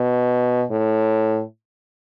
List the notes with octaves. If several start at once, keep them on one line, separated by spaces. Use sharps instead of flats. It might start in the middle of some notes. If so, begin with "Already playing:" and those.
Already playing: B2
A2